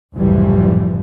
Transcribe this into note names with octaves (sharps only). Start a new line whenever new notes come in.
F#1 C2 A2 E3 F3 G3